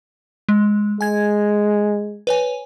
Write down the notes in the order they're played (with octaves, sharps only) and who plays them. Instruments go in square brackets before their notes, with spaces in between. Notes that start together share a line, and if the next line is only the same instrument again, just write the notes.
[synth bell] G#3
[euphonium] G#3 [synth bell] G#5 G#6
[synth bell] B4 C#5 G#5